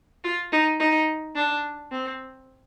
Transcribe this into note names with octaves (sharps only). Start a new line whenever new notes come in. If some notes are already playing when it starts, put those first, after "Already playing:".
F4
D#4
D#4
D4
C4